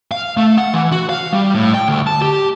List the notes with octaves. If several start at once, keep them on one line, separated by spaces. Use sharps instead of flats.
F5
A3
F#5
E3
F#4
F5
G3
A2
G5
D2
A5
G4